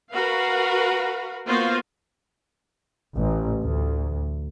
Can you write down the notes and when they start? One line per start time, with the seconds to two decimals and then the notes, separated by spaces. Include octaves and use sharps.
0.12 F#4 A#4 B4 F5
1.46 A#3 B3 F4 F#4 C5 F5
3.14 A1
3.63 D2